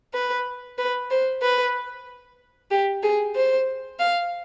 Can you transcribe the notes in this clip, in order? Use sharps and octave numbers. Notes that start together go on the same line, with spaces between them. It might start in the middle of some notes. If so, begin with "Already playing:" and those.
B4
B4
C5
B4
G4
G#4
C5
F5